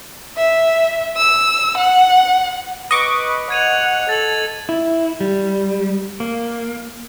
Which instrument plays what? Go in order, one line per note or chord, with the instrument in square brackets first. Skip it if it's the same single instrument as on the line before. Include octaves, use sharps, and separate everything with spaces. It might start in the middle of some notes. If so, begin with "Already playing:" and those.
[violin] E5
E6
F#5
[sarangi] B4 [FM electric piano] D#5 C#6 D6
[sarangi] F#5 [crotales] G#6 D#7 F7
[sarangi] A4 [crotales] A6 F7 F#7
[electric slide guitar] E4
G3
A#3